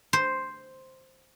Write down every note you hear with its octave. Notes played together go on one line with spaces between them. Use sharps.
C5